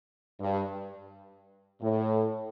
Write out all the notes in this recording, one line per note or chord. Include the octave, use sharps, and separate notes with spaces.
G2
A2